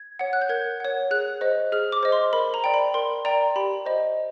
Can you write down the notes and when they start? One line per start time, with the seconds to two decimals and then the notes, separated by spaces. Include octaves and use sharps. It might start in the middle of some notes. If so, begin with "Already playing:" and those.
Already playing: G#6
0.19 C#5 F#5
0.33 F#6
0.42 G6
0.49 A#4 G#6
0.80 C#5 F#5
1.11 G#4 F#6
1.41 C5 D#5
1.72 G#4 F6
1.92 D6
2.03 C5 D#5
2.12 C6
2.33 A#4 B5
2.54 A#5
2.64 D5 G5
2.74 B5
2.94 A#4 C6
3.25 D5 G5 A#5
3.56 G4 B5
3.86 C5 D#5